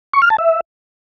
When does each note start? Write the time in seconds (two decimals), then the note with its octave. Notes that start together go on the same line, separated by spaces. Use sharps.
0.14 C#6
0.22 F6
0.30 A5
0.38 E5